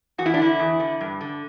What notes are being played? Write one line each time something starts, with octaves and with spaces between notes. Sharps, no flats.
E2 F#4
E4
D4
D3 E4
E2
D3
G2
D3